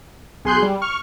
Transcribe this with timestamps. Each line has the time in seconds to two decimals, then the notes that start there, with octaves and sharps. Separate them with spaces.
0.45 B1 G#4 C6 F#6 G6
0.62 G3
0.82 C#6 F6